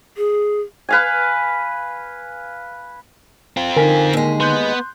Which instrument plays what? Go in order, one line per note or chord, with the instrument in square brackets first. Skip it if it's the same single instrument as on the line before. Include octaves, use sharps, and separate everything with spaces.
[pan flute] G#4
[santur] B4 F5 G#5
[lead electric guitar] C4 F4
[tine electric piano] D3 D#4 [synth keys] A#4 G#5 B6
[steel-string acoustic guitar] D#2 G#3
[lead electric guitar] B3 [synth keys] C6 F#6 G6